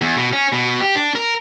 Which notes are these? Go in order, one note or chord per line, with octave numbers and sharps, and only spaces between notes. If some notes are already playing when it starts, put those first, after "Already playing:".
E2
B2
C#4
B2
G4
D4
A#4